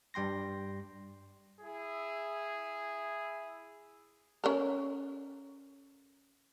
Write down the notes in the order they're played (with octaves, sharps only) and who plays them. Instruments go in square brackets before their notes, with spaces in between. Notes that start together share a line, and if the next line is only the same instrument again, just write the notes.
[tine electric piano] G2 G3 G5 C6 A#6
[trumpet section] E4 G#4
[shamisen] C#4 A4 A#4